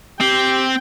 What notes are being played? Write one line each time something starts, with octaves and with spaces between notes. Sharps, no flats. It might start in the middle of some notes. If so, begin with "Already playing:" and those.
C4 G4 G5